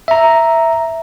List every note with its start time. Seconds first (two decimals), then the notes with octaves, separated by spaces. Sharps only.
0.08 E5 A#5